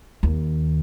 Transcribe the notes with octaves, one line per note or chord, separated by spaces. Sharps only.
D#2